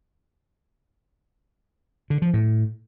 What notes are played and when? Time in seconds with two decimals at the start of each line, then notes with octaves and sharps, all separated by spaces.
2.10 D3
2.22 F3
2.34 A2